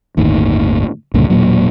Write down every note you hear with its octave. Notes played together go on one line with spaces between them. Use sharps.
G1 D#2 A2 D#3
C#2 G2 A#2 D3
E1 A#2 F#3